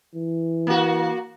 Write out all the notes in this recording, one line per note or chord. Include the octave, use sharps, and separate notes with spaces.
E3
A#3 F#4